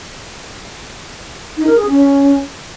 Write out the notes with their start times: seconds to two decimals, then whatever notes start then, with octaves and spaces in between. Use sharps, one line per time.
1.57 D#4
1.67 A#4
1.76 G#4
1.86 C#4